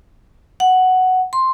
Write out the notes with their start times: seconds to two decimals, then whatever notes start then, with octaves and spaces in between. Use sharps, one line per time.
0.60 F#5
1.33 C6